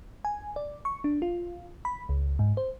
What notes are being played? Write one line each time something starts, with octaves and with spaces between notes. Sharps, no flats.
G#5
D5
C#6
D4
F4
B5
C#2
G#2
C5